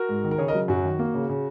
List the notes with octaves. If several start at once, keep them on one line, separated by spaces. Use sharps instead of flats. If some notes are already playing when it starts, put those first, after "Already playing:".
Already playing: F#4 A#4
G#2
D#3
A#4
C#3 G#4 C#5
A#4 D#5
F#3
F#2 F#4
D#3
A#3
C#3
C#3